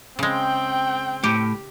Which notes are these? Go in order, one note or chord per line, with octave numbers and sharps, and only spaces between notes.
C#3 G#3 C4 G5
A2 G4